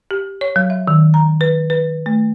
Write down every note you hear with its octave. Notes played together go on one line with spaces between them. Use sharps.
G4
C#5
F#3
E5
D#3
A#5
B4
B4
A3